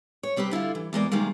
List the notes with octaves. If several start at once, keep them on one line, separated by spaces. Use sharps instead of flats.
C#5
C3 G3 C4 G4 B4
D3 E4 F4 F5
E3
E2 G#3 A#3 D5
C3 D#3 G3 G#3 A#3